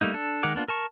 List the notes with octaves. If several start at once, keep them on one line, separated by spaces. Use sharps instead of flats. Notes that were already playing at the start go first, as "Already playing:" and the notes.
G3 A3 A#3 D#4
D4 A4
D#3 G#3 A#4 F#5 D6
A#3 B3 D4 F4
A#4 A5 C#6